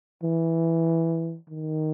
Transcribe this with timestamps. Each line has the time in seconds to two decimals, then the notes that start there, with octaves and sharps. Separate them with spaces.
0.23 E3
1.49 D#3